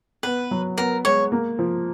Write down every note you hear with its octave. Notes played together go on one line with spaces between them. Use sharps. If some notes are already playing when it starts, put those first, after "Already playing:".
B3 B4
F#3
B3 A#4
G#3 C#5
A#3
F3